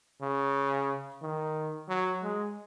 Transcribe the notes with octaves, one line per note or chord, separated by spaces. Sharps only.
C#3
D#3
F#3
G#3